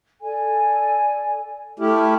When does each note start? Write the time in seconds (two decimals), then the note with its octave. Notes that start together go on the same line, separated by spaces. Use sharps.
0.21 A4 D5 G#5
1.79 A3 E4 G4 A4 F6